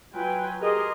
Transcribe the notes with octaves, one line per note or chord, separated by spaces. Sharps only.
F#3 F4 B4 G5 G#5
G4 G#4 A#4 D#5 C6